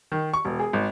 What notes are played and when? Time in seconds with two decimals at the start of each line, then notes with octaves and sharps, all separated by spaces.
0.12 D#3
0.34 C#6
0.45 E1
0.59 G#4
0.73 G#1